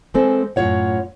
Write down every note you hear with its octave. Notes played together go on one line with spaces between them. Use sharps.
E3 G#3 C4 A4 C5
F#2 A2 F3 F4 C#5 F#5